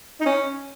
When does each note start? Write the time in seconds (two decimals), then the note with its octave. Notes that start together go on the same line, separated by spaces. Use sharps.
0.20 D#4
0.26 C#4